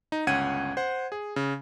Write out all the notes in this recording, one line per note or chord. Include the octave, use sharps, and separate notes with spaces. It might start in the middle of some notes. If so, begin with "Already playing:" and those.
D#4
G1 C#2 C#4 F#5 G#6 D#7
C5 F#5
G#4
C#3